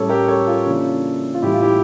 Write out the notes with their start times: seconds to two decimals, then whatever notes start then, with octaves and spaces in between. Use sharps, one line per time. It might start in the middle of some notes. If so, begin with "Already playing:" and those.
Already playing: A2 G3 C#4 A4 C#5
0.09 G4 A#4
0.28 A4 C#5
0.47 F4 A4
0.66 C#3 E3 A#3 D4
1.34 F4
1.42 A2 E3 G3 E4 G4
1.54 F4
1.62 E4 G4